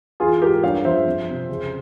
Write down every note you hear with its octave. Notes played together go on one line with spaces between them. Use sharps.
E3 F4 G#4
G#2 G4 A#4
G2 C#5 F5
F3 C5 E5
F2
C3
C#3